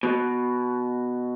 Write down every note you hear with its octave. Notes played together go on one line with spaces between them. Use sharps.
B2